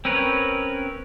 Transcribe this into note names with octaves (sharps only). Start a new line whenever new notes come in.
C4 C#4 A#4 B4 C#5